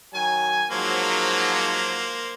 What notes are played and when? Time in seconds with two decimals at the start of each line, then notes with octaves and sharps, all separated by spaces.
0.13 D#3 F#3 G#5
0.71 G#2 F3 F#3 A#3 C5